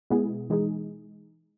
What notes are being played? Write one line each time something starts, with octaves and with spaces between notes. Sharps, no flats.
B2 G#3 B3 E4 G#4
E3 G#3 D#4 G#4